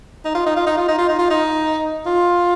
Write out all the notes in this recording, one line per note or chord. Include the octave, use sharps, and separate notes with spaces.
D#4
F4
D#4
F4
D#4
F4
D#4
F4
D#4
F4
D#4
F4